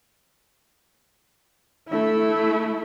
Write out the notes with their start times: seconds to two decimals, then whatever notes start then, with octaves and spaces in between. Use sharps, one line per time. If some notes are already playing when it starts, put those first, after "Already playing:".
1.88 A3 E4